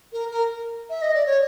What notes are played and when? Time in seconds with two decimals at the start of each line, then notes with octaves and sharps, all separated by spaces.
0.12 A#4
0.30 A#4
0.89 E5
1.02 D#5
1.14 D5
1.26 C#5